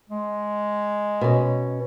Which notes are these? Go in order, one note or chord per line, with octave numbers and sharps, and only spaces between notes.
G#3
B2 C#4